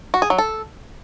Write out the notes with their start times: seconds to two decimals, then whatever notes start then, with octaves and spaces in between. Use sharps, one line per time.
0.14 F#4
0.22 G#4
0.30 F#3
0.38 A4